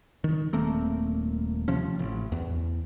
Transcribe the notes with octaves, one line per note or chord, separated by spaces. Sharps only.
D#3
D#1 A3 A#3 C4
C3 F3 C#4
A1
E2